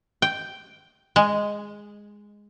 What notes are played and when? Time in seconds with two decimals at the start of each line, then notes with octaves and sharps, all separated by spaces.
0.22 G5
1.16 G#3